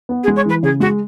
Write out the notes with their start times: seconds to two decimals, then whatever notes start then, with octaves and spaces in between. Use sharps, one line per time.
0.09 B3
0.23 G#4
0.28 G#3
0.36 C#5
0.45 E3 B4
0.63 C#3 G#4
0.80 G#3 F#4